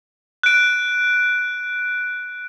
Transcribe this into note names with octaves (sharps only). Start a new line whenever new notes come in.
F#6 D7